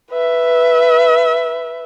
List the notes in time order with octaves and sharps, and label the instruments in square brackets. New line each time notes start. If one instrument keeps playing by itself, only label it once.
[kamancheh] B4 E5